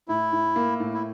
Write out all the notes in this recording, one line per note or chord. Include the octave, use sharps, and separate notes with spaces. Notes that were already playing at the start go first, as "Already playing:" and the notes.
A2 E4
A2
A#3
A2
E4